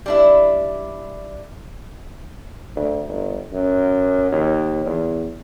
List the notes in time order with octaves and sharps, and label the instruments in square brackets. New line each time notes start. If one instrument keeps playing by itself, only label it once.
[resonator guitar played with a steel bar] G3 D4 E4
[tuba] D2
G1
F#2
D#2
E2